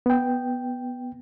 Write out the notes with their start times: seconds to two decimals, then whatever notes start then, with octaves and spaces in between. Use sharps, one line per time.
0.06 B3 G5